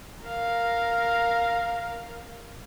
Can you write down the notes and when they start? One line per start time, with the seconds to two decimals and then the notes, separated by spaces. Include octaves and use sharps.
0.25 A#4 F5